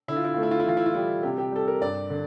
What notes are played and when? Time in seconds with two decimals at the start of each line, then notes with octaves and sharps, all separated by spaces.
0.08 D3 E4
0.16 F4
0.25 E4
0.34 A3 F4
0.43 E4
0.51 F4
0.60 E4
0.66 E3 F4
0.77 E4
0.86 F4
0.94 G3 E4
1.23 C3 G4
1.38 G4
1.52 G3 A4
1.68 A#4
1.82 G2 D5
2.10 D3